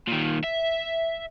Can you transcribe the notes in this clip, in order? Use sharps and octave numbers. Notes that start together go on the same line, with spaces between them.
A#2 D#3
E5